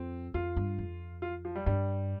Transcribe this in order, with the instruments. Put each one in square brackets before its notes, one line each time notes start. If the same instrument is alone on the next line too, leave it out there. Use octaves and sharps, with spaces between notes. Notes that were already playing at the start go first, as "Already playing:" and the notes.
Already playing: [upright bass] F2 [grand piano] C4
[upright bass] F2 [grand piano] F4
[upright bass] G2
F2
[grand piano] F4
F3
G3
[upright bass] G2 [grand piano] G3